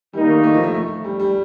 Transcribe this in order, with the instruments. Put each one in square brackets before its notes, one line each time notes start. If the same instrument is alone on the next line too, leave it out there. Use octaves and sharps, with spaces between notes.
[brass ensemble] D#3 A#3 D#4 [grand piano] G3
[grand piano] A3
A3
F3
A3
A3
G3
G3